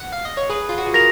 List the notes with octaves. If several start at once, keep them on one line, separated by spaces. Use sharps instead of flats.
F#5
F5
D#5
C#5
G#4 B4 D#6
F4
F#4
G#4
F#4 A#4 A#6 F7